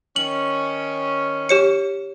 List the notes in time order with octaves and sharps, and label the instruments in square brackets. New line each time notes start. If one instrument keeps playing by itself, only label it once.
[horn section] D#3 C#4 [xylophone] F#7
[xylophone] G4 C#5 C#7